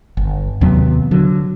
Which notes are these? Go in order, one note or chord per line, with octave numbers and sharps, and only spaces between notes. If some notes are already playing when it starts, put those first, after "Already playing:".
G1
D#2 C3 F#3 B3
D3 F#3